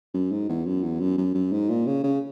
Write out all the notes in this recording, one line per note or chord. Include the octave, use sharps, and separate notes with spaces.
F#2
G#2
E2
F#2
E2
F#2
F#2
F#2
G#2
A#2
C#3
C#3